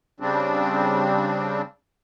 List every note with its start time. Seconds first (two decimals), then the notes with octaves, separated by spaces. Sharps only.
0.20 C#3 G3 C4 D4